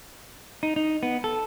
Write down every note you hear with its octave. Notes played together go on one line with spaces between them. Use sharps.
D#4
D#4
B3
A4